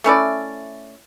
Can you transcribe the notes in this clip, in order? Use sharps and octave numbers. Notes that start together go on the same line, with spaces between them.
A3 C#4 E4 D5